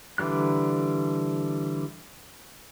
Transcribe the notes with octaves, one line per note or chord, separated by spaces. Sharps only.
D3 E3 G3 F#6